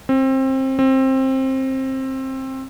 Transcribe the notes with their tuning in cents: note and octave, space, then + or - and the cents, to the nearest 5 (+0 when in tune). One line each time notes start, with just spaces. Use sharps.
C4 +25
C4 +20